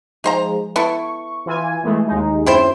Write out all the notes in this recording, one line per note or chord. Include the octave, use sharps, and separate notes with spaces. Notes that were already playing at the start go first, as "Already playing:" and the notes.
F3 G#3 D#4 C5 A#5
B3 E4 A4 C#6
E3 F4 G#5
E3 G#3 A3
D#2 G#3 D#4
F#2 C4 E4 C5